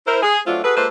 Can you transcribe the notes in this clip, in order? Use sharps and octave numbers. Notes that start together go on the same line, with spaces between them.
E4 A#4 C5
G#4
F#3 A3 C4 D4 F4
F#4 G#4 A4 B4
G#3 A#3 F4 A4 B4 C5